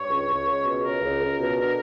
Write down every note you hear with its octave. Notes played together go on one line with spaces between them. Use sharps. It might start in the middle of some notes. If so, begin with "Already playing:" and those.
Already playing: G2 C#5
C#2
C#2
C#2
B2
C#2 A#4
C#2
C#2
B2
D3